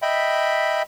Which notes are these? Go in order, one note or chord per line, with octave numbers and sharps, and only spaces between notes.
D#5 E5 G5 B5